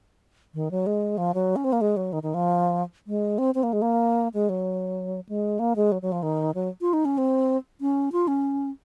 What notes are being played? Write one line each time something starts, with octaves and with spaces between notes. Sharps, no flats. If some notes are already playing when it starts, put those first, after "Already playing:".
D#3
F#3
G#3
F3
F#3
C#4
C4
A#3
G#3
F#3
D#3
D#3
F3
G#3
C4
C4
A#3
G#3
A#3
G#3
F#3
G#3
A#3
G#3
F#3
F#3
F3
D#3
F#3
F4
D#4
C#4
C4
C#4
F4
C#4